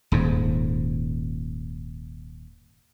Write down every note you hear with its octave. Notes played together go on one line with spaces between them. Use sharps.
D#1 G#2